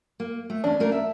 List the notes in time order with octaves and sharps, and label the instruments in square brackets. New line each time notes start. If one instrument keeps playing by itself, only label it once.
[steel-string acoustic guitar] A#3
A3
[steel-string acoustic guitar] E2 C#4 [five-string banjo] D4
[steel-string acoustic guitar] A3 A#3 A#4
E5